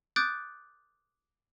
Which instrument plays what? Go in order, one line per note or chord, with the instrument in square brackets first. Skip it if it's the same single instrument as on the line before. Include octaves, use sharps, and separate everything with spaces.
[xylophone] D6 D#6 F#6 G6 A6 D7